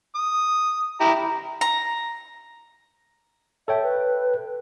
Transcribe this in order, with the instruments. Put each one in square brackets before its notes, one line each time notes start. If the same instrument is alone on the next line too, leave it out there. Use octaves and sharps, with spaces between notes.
[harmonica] D#6
E4 G4 A#5
[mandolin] A#5
[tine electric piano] A4 C#5 G5 [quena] E5
[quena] B4